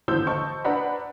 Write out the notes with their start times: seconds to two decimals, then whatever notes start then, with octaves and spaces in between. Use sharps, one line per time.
0.08 G#1 D3 E3 C5 E6 G6
0.27 C5 D#5 A5 C#6
0.65 D4 B4 F#5 A#5 B5